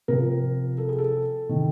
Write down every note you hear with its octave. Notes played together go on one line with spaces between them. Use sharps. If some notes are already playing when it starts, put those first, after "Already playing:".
C3 F3 A#4
A4
G#4
A4
C3 D#3